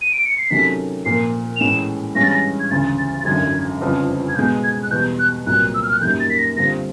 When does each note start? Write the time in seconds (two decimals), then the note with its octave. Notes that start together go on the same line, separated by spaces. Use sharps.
0.01 D#7
0.13 D7
0.26 C#7
0.38 C7
0.50 C3 D#3 F#3 A3 C#4 B6
1.06 A#2 F3 A#3 C7
1.56 F7
1.60 A2 E3 G#3 C#4 E7
2.15 G2 E3 G#3 C#4 A#6
2.23 A6
2.31 A#6
2.60 G#6
2.70 E1 D2 C#3 A6
2.98 A6
3.21 A6
3.25 G#1 F#2 D3 G#6
3.81 G1 F2 C#3 F3
4.29 G#6
4.36 B2 G#3 B3 G6
4.64 G#6
4.83 F#6
4.91 E2 B2 G3 B3 G6
5.19 F#6
5.46 C2 A#2 F#3 F#6
5.74 E6
5.83 F6
5.93 F#6
6.01 F#2 D#3 G3 A#3 G6
6.20 A6
6.30 B6
6.38 A#6
6.57 G2 D3 G3 C4 F4 A#6